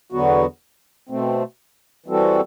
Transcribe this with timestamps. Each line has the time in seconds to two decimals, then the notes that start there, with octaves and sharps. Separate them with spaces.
0.12 E2 D3 F#3 B3 F#4
1.09 B2 A3 C4
2.06 E3 G3 C4 F#4 A4